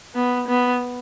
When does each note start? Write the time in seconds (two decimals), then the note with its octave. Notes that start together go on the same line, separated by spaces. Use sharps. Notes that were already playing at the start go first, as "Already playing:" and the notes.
0.15 B3
0.48 B3